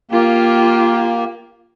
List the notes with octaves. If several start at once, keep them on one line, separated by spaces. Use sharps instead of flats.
A#3 F4 G4